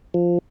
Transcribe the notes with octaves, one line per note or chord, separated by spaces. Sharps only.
F3